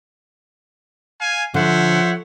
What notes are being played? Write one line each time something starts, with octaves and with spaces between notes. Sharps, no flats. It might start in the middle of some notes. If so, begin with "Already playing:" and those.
F5 G#5
D3 F3 C5 C#5 E5 F#5